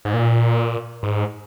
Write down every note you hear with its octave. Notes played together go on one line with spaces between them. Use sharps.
G#2
A#2
G#2